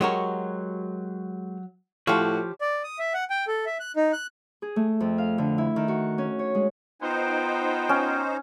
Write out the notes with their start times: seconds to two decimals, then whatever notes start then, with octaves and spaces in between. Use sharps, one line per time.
0.01 F#3 G#3 F#4 G4 A#4 C#5
2.07 A2 F3 F#4 G4 C#5
2.60 D5
2.84 D#6
2.99 E5
3.14 F#5
3.30 G5
3.48 A4
3.66 E5
3.80 F#6
3.96 D#4
4.13 F#6
4.62 G#4
4.76 A3
5.00 F2
5.18 F5
5.38 D3
5.58 E4
5.76 D#3
5.88 F#4
6.18 C#4
6.39 C#5
6.55 G#3
7.02 B3 D#4 F4 C5 G5
7.89 C#4